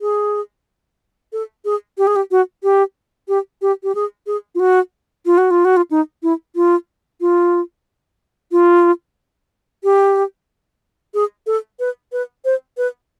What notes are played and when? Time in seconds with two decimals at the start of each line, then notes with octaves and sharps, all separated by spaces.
0.01 G#4
1.33 A4
1.65 G#4
1.98 G4
2.07 G#4
2.16 G4
2.31 F#4
2.63 G4
3.28 G4
3.62 G4
3.83 G4
3.95 G#4
4.27 G#4
4.55 F4
4.60 F#4
5.26 F4
5.38 F#4
5.51 F4
5.65 F#4
5.77 F4
5.91 D#4
6.23 E4
6.56 F4
7.21 F4
8.52 F4
9.84 G4
11.14 G#4
11.47 A4
11.80 B4
12.12 B4
12.45 C5
12.77 B4